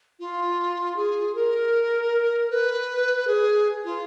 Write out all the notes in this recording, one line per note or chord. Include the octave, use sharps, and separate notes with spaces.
F4
G#4
A#4
B4
G#4
F4